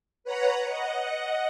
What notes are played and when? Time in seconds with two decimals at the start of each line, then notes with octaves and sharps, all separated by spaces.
0.24 B4 C#5 F#5 A#5
0.68 D#5 F#5